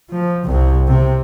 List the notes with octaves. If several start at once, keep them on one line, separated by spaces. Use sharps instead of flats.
F3
C2 C3
C3